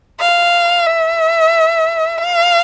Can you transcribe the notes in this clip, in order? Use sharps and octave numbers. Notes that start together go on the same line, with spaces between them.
F5
E5
F5